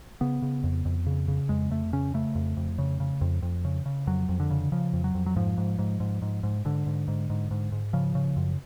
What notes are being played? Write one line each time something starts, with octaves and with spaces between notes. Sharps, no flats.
C#3 B3
C#3
F2
F2
C#3
C#3
F2 G#3
F2 A3
C#3 C#4
C#3 A3
F2
F2
C#3
C#3
F2
F2
C#3
C#3
F2 F#3
F2
D3
C#3
C#3 F3
F2
F#3
F2
F#3
G#2 F3
G#2
G#2
G#2
G#2
G#2
G#2 D3
G#2
G#2
G#2
G#2
G#2
C#3 F3
C#3
F#2